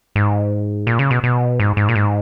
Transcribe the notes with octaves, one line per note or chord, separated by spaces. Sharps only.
G#2
A#2
C#3
B2
B2
G#2
G#2
A#2
G#2